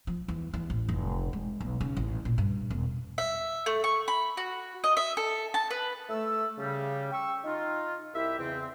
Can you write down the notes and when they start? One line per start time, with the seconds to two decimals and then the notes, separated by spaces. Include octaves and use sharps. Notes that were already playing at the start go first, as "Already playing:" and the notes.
0.07 F3
0.28 E2
0.54 E2
0.70 A1
0.89 F1
1.33 G#3
1.60 B1
1.81 C#3
1.97 A1
2.25 A#2
2.38 G2
2.70 E1
3.18 E5
3.66 A3
3.84 C#6
4.08 B5
4.37 F#4
4.84 D#5
4.97 E5
5.17 A4
5.54 A5
5.71 B4
6.09 A3 E6
6.58 C#3 G3
7.12 G5 C#6 E6
7.44 D#4 F4
8.14 C2 E4 G4 E5
8.38 E2 C#3 C4